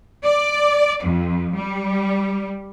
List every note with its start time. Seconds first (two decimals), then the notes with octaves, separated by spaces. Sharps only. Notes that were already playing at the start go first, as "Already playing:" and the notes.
0.23 D5
1.03 F2
1.55 G3